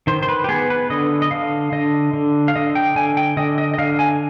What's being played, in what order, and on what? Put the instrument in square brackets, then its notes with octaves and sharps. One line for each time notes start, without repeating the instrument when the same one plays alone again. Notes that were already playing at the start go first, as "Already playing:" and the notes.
[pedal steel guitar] D#3 C5
C5
B4
G4
B3 G#4
B4
D3 D#5
D#5
D3 F5
D3 D#5
D3
F5
D3 D#5
G5
D3 G#5
G5
D3 D#5
D#5
D#5
D3 F5
G#5